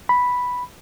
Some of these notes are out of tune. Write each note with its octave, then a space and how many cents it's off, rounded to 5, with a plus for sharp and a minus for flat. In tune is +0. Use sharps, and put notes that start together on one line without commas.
B5 +0